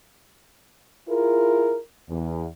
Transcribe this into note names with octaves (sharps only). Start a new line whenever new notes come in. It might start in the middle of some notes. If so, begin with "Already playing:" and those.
E4 F4 G#4 A#4
E2